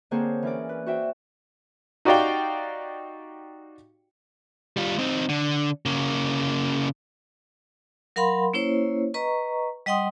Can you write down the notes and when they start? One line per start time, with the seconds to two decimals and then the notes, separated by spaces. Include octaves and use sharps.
0.11 D3 A#3 C4 G#4 C5 C#5
0.43 E3 C#4 A#4 D5
0.69 B4
0.86 F#4 C5 E5 G5
2.05 D#4 F#4 G4 D5 F5 G5
4.77 G3 F4
4.99 C4 D#4
5.29 D3
5.86 C#3 A#3
8.16 F#3 A#4 F5 F#5 B5 C6
8.54 A#3 C#4 E4 C5 C#5
9.14 B4 D#5 A#5 C#6
9.86 G3 D#5 F#5 G5 C6 D#6